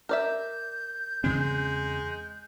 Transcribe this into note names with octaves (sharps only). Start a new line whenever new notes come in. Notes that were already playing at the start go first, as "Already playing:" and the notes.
A#4 D5 E5 G6
E2 C#3 G#3 C4